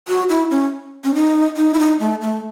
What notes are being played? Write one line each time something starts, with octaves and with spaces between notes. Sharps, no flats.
F#4
E4
C#4
C#4
D#4
D#4
E4
D#4
A3
A3